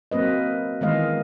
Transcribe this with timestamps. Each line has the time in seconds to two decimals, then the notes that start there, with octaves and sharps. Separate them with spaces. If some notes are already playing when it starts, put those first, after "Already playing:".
0.11 F#3 A#3 C4 B4 D#5
0.81 D#3 E3 G#3 B3 D#5 F5